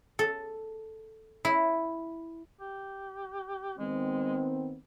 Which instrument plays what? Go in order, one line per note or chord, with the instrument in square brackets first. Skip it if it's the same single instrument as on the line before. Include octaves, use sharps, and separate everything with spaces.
[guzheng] A4
E4
[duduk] G4
[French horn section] D#3 B3 C4 [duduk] G#3